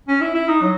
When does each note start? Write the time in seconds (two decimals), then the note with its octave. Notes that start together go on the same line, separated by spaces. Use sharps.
0.08 C#4
0.21 E4
0.35 E4
0.48 D#4
0.62 F#3